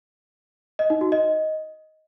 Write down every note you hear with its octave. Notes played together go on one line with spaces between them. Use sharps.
D#5
D#4
F#4
D#5